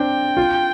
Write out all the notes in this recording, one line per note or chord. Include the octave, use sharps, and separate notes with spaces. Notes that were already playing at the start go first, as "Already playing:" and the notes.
Already playing: C4 D4 G5
F4